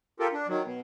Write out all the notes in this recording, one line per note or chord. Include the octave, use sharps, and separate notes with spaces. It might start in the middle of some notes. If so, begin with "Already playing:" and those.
F4 G4 A4 A#4
D4
D#3 F#3
B2